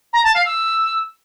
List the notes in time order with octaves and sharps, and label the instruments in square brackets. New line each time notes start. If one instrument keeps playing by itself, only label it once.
[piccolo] A#5
A5
F5
E6